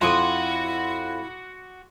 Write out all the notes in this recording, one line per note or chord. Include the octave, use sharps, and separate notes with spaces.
F2 E4 F#4 F#5 C6 D6 D#6